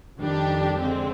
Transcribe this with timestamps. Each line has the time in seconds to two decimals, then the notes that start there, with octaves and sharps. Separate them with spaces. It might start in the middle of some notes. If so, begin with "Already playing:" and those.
0.18 F2 D#3 G3 D4 G4
0.81 D3 G#3 C4